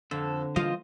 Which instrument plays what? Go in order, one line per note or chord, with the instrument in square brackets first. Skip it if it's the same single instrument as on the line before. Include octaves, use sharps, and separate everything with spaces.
[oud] F2 [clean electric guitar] D3 [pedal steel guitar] A4
[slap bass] E3 G3 A#3 [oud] F4 [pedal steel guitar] C5 D#5